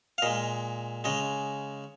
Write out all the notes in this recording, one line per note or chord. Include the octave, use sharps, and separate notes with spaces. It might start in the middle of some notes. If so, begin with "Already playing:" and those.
F5
A#2 G#3 D#5
C#3 G#3 D#5